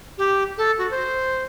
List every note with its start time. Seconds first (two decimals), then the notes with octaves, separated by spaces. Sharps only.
0.18 G4
0.58 A4
0.78 F#4
0.91 C5